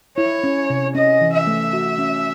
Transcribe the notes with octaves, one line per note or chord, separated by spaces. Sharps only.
E4 C#5
C#4
C3
C#4 D#5
E3
E5
A3
F#4
C#4